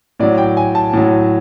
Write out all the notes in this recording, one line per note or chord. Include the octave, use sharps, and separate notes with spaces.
A2 F#3 D5
G5
G#5
A5
A2 F#3